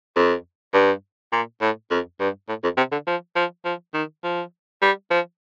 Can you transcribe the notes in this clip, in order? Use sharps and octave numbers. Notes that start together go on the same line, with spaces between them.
F2
G2
A#2
A2
F2
G2
A2
F2
C3
D3
F3
F3
F3
D#3
F3
G3
F3